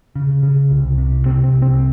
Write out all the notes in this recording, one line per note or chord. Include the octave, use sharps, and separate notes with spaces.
C#3
C#3
C2
C3
C3 C4
C4
C2
C4